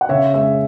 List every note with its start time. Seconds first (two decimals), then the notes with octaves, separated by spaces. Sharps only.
0.01 F#5
0.09 C#3 C#5 E5
0.34 G#3 C#5 E5